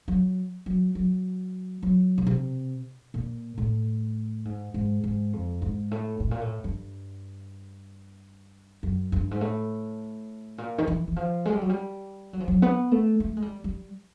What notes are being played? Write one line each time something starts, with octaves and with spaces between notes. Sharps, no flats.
F#3
F#3
F#3
F#3
C#3
C3
A#2
A2
G#2
G#2
G#2
F2
G#2
A2
A2
A#2
A2
G2
F#2
G2
G#2
A2
A#2
D#3
E3
E3
F3
G#3
G3
F#3
G3
F#3
F3
F#3
B3
A3
A3
G#3
G3
G3